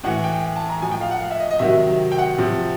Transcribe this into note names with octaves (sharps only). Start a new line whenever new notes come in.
A2 E3 F#5
G5
A5
A#5
A2 F3 G#5
G5
F5
F#5
F5
E5
D#5
D#5
C3 D#3 F#3 E5
G5
F#5
C3 F3